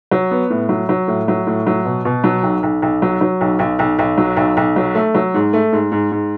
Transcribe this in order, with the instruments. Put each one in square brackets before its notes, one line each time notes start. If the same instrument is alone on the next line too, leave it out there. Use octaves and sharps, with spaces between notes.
[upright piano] F#3
B3
A2
F#3
F#3
A2
F#3
A2
F#3
B2
B2
F#3
B1
B1
B1
F#3
F#3
B1
B1
B1
B1
F#3
B1
B1
F#3
A3
F#3
G#2
A3
G#2
G#2
G#2